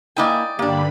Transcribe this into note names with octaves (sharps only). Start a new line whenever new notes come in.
A#3 E4 D5 D#5 G5 G#5
G2 D3 G3 A#3 D4 B5